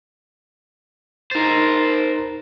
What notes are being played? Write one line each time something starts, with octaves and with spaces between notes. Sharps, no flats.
D#4 A#4 C5 A6